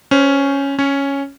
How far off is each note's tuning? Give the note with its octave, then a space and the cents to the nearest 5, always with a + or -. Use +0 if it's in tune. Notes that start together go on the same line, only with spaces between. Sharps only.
C#4 +0 C5 -15
C#4 +0 C#5 +0